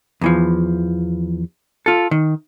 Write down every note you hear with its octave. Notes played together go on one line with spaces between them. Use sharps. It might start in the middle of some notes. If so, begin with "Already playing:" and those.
E2 E3 F3
F4 A4
D#3